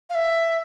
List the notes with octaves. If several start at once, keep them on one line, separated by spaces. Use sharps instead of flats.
F5
E5